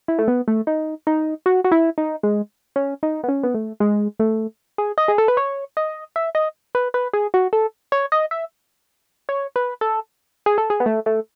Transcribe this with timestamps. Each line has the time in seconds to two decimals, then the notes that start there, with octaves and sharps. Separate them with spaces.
0.08 E4
0.19 A3
0.28 B3
0.48 A3
0.67 D#4
1.07 D#4
1.46 F#4
1.64 F#4
1.72 E4
1.98 D#4
2.23 G#3
2.76 C#4
3.03 D#4
3.24 B3
3.28 C#4
3.43 B3
3.54 A3
3.80 G#3
4.19 A3
4.78 G#4
4.98 D#5
5.08 G#4
5.18 A4
5.28 B4
5.37 C#5
5.77 D#5
6.16 E5
6.35 D#5
6.75 B4
6.94 B4
7.13 G#4
7.34 F#4
7.53 A4
7.92 C#5
8.12 D#5
8.31 E5
9.29 C#5
9.56 B4
9.81 A4
10.46 G#4
10.58 A4
10.70 G#4
10.80 B3
10.86 A3
11.06 A3